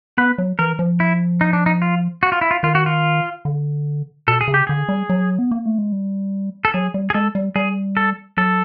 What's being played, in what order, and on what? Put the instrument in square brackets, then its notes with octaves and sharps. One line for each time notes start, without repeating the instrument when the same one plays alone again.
[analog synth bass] B3 [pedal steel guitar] B4
[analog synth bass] F#3
[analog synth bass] E3 [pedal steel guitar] A#4
[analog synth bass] F3
[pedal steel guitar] E4
D#4
D4
D#4
F4
F#4
F4
E4
F4
[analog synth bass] D#3 [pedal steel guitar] F4
[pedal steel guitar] F#4
F4
[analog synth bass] D3
[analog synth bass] B2 [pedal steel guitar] A4
[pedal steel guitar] G#4
[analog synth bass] C#3
[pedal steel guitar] G4
[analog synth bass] D3 [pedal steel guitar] G#4
[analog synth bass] G3
F#3
B3
A#3
A3
G#3
G3
[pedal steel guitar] A4
[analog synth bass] F#3 [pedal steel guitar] G#4
[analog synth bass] G3
[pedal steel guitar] G#4
[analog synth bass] G#3 [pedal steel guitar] A4
[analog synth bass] G3
[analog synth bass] G3 [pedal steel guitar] G#4
[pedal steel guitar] A4
[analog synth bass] F#3 [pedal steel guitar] A4